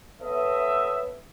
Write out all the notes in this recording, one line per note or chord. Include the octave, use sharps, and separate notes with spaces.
B3 A4 B4 C#5 D#5 E5